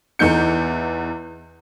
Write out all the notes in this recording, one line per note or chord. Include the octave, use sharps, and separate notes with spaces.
E2 E3 D#4 G6 C#7